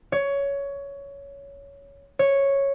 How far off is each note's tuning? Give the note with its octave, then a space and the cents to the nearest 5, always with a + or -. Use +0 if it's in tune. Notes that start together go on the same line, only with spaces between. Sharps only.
C#5 +15
C#5 -5